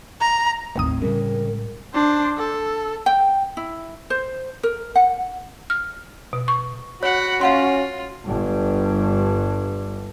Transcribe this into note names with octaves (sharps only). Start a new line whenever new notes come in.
A#5
G1 D#2 A2 C4 D#6
A2 C#3 G3 G#3 C#4 A#4
D4 C5
A4
G5
E4
C5
A#4
F#5
F6
B2
C#6
F#4 C#5 F#5 B5
C#4 F4 F5 F#5 C6
G1 G2